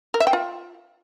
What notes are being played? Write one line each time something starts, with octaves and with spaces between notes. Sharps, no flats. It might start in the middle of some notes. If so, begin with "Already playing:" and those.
A#4
E5
G5
F4